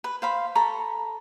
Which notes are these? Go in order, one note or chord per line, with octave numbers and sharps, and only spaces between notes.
B4
C5 F5 B5
A4 A#5 B5 C#6